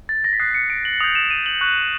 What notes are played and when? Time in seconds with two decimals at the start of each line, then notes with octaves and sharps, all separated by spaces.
0.09 A6
0.24 A#6
0.33 B6
0.40 D#6 F#6 C7
0.54 C#7
0.70 D7
0.85 F#7
1.00 D#6 G6 F7
1.15 E7
1.30 D#7
1.46 F#7
1.61 C#6 F#6